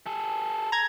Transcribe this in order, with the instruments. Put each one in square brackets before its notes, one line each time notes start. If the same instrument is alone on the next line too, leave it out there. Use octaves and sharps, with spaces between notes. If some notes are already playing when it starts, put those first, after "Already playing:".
[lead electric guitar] G#4 A4
[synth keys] A#5 G#6